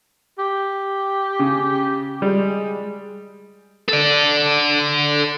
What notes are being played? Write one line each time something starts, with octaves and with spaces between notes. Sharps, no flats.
G4
C#3
G3 G#3
A4 D5